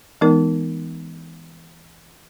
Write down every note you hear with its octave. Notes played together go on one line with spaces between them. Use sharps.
E3 G#3 B3 D#4 A#4